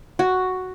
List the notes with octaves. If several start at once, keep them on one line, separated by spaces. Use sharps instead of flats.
F#4